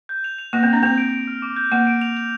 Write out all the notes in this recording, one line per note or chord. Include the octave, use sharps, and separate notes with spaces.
G6
F7
F7
A#3 A#6
C4
D4 F7
C4 F7
D7
D7
F6
D6
G6
A#3 G6
D7
F7
F7